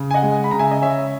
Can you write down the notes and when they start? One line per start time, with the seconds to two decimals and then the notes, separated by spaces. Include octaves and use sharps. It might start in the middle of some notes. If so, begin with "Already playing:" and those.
Already playing: C#3
0.11 G#5
0.14 D#5 F#5
0.22 G#3
0.44 B5
0.51 C#3 A#5
0.59 E5 G#5
0.71 D#5
0.82 C#3 C#5 E5